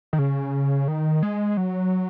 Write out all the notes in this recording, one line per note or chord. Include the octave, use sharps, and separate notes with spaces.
D#3
C#3
D#3
G#3
F#3